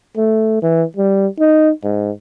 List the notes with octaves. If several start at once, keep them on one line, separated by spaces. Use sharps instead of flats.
A3
E3
G3
D#4
G#2